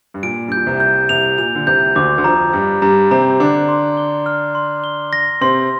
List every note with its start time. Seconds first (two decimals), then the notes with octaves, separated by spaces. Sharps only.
0.14 G2
0.23 A#2 D7
0.48 G2 G6
0.57 A#2
0.66 C2 C3
0.80 G6
1.09 C2 C3 F7
1.38 A#2 F7
1.55 D3
1.66 C2 C3 G6
1.96 D2 D3 D6
2.18 D3
2.24 F2 F3 A#5
2.53 G2 G3 A#5
2.82 G2 G3 A#5
3.11 C3 C4 A#5
3.40 D3 D4 A#5
3.68 C6
3.97 G7
4.26 F6
4.55 C6
4.84 G7
5.13 A#6
5.41 C3 C4 C6